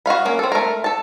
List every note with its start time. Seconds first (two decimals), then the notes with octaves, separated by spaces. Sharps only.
0.06 F#4 D#5 F5 B5
0.25 A#3 C#4
0.39 C4 A4
0.52 A3 A#4
0.84 A4 A5